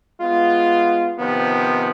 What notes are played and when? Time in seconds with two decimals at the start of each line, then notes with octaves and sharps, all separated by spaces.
0.20 G#3 B3 F4
1.18 C3 D#3 F3 B3